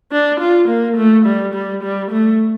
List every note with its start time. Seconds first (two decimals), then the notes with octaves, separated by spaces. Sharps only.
0.12 D4
0.40 F4
0.68 A#3
0.97 A3
1.25 G3
1.54 G3
1.83 G3
2.11 A3